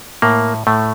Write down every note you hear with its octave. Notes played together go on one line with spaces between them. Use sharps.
A2 A#3
A2 A3